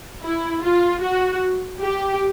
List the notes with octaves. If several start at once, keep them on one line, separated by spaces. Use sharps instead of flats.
E4
F4
F#4
G4